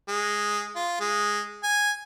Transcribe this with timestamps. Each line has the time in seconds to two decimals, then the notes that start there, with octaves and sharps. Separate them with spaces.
0.08 G#3
0.76 F4
1.00 G#3
1.63 G#5